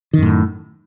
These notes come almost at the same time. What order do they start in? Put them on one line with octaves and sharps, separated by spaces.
D#3 F#2 A2